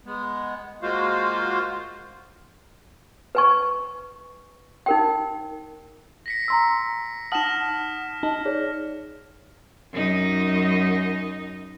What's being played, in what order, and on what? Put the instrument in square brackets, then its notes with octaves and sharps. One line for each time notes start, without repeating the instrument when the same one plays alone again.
[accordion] G#3 B3
G#3 A#3 F4 F#4 C5 F5
[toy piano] B4 G#5 C#6
D#4 A#4 G5
[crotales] A#6 B6 C#7
[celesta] A#5 C6 E6
[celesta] D#4 F#7 [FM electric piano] F#5 A5 D#6 [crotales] F6 A#6 E7
[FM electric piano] D#4 [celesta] A5
[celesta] G#4 C#5 D5
[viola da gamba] F#2 D#4 D#5